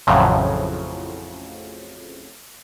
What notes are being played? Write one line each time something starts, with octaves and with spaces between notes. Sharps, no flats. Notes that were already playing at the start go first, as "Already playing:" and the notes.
A1 F2 A2 C#3 F3 F#3